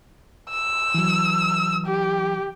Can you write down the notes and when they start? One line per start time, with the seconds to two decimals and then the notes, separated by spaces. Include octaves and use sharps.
0.50 E6
0.94 E3 F#3
1.86 G4